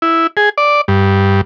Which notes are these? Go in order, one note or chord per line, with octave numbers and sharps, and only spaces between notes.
E4
G#4
D5
G2